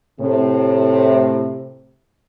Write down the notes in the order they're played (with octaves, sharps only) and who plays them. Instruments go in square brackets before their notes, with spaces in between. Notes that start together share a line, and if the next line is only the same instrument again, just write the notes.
[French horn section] A2 C3